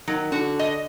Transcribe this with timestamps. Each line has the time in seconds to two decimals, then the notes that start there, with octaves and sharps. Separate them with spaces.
0.08 D#3 F#3
0.32 D3 F#4
0.59 D#5